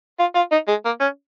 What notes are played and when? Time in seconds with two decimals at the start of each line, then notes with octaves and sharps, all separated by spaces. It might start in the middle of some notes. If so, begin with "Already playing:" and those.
0.19 F4
0.35 F4
0.52 D#4
0.68 G#3
0.85 A#3
1.01 C#4